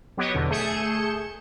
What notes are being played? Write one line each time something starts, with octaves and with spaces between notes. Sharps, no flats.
F#3 B3 G4 C#5 D#5
E2 B2 D3
A3 G#4 G6 C#7 E7